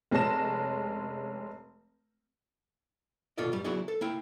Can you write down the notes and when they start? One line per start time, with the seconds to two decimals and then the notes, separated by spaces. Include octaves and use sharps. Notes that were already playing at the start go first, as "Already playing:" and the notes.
0.11 F1 G#3 C#4 A5 A#6 E7
3.38 D#2 B2 F4 A4 D5 D#5
3.52 F#2 G3
3.64 F#3 B3 E4 F#4 G#4 D5
3.88 A4
4.01 A#3 E4 G5